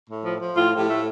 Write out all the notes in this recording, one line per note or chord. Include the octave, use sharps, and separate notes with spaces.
A2
F3
F3
A2 F4
A2 G4
A3